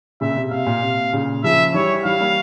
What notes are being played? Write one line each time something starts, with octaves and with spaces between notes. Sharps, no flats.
A#2 C#3 E5
C3
C3 F5
A#2
C3
A#2 C#3
C#3 F3 E5
E3 G3 C#5
E3 G3 F5
G3 A#3